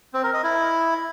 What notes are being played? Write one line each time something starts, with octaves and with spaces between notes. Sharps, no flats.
C4
A#4
D#5
E4